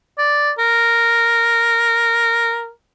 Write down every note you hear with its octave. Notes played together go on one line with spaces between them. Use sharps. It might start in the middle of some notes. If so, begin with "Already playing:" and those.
D5
A#4